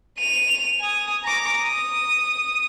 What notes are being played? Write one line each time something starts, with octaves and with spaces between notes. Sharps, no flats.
D#7 F7
G#5 D#6
A#5 D6
D#6